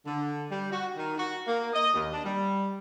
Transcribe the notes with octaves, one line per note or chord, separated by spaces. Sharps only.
D3
G3
F#4
D#3
F#4
A#3
D#5
D#2
D4
G3